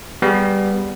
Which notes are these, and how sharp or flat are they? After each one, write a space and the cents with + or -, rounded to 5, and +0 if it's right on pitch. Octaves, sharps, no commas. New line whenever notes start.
G3 +0 B3 -10 G#4 +0